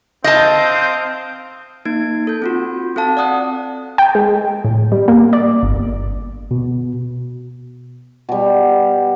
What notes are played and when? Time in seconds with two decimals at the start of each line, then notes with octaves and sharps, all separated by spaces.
0.24 C4 D#5 F5 A5 D#6 G6
1.85 A#3 D#4 G#6 D7
2.27 A4 G6
2.42 C4 F4 F#4
2.96 C4 A4 F5 A5
3.17 D5 F#5 D#6 F#6
3.98 G5
4.15 G#3
4.65 A2
4.92 G3
5.08 A#3
5.33 D5
5.63 G1
6.51 B2
8.29 B2 G3